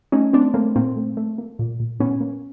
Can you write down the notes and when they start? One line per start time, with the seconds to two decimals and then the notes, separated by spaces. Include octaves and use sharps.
0.12 A3 C#4 D#4
0.33 A3 C4 D4
0.54 A3 A#3 C4
0.76 A#2 A#3 C4
0.96 A3
1.17 A3
1.38 A#3
1.59 A#2
1.80 A#2
2.00 A#2 B3 C#4
2.20 A#3